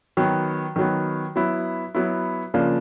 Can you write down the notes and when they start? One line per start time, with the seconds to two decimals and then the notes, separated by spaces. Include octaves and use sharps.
0.17 D#3 F#3 B3
0.76 D#3 F#3 B3
1.36 F#3 B3 E4
1.95 F#3 B3 E4
2.54 C#3 F3 A#3 D4